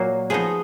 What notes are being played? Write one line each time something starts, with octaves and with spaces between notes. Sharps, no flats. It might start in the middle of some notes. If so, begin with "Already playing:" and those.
Already playing: A#2 F#3 A#3
F3 B3 D#4 G#4